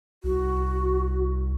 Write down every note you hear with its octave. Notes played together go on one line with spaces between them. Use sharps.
C2 F#4